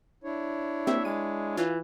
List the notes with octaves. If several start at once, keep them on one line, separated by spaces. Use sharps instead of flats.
D4 E4 C#5
A#3 C4 G4 E5
G#3 D#7
E3 F4